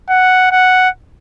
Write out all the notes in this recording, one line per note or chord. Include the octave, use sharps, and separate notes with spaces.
F#5
F#5